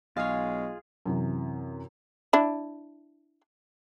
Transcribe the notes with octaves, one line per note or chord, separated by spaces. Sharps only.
B1 G#3 F4 G#4 C#5 F5
F#2 C3 E3
D4 E4